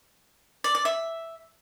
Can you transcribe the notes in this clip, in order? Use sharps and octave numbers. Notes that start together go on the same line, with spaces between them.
D5
D5
E5